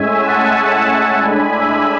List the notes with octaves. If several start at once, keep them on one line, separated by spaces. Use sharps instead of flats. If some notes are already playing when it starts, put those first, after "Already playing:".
Already playing: A2 G#3 C#4 E5 G#5
F#5 A5
A2 G#3 D4 G#5 B5
E5 G#5